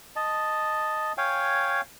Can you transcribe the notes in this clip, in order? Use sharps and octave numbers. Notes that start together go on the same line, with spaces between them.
D#5 A5
C#5 F5 G5 G#5